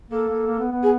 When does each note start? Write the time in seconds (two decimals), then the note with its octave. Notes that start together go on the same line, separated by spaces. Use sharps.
0.10 A#3 A4
0.29 A#3
0.47 A#3
0.59 B3
0.71 B3
0.82 G#4